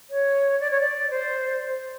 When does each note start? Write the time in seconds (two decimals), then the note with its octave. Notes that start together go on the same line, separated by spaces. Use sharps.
0.10 C#5
0.60 D5
0.71 C#5
0.81 D5
1.11 C5